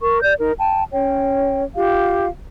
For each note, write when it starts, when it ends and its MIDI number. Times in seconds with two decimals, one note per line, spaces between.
0.01 0.21 70
0.01 0.21 85
0.22 0.34 74
0.22 0.34 91
0.40 0.52 63
0.40 0.52 70
0.58 0.83 79
0.58 0.83 81
0.92 1.63 61
0.92 1.63 73
0.92 1.63 79
1.74 2.28 65
1.74 2.28 67
1.74 2.28 77